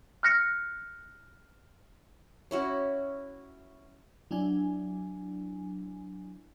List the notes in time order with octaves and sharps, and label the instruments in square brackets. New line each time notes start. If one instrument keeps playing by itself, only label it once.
[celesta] F6 F#6 A#6 C#7
[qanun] C#4 E4 F#4
[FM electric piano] F#3 D4 E4 G#5